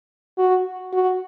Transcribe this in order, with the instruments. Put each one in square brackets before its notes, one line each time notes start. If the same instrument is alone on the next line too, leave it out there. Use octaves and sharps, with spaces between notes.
[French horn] F#4
F#4